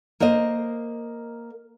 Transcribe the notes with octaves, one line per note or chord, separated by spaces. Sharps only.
A#3 A#4 C5 D#5